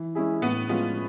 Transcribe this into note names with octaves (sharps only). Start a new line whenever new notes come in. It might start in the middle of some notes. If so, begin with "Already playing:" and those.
Already playing: E3
G#3 C#4 E4 G#4
A2 B3
F3 G#3 B3 C#4 F4